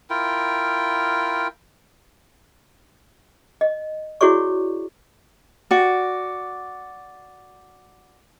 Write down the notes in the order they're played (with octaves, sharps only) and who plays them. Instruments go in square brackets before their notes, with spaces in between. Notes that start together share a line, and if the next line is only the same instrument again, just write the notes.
[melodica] E4 F4 A#4 G5
[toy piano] D#5
E4 F#4 G#4 C#5 D5 C#6
[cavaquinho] F#4 D5